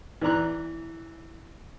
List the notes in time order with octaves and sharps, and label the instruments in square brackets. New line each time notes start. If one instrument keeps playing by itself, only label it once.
[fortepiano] E3 D5 A#5 F#6